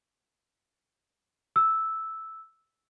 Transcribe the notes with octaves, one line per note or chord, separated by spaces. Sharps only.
E6